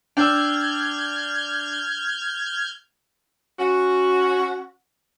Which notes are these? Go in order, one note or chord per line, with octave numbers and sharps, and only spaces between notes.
D4 G5 E6 F6 G6 G#6
C#4 F#4